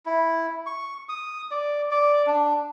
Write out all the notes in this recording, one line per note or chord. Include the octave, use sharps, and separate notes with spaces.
E4
C#6
D#6
D5
D5
D4